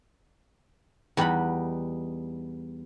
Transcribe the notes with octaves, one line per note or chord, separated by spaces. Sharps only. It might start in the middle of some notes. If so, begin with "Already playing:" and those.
E2 G3 D#4 F#5 B5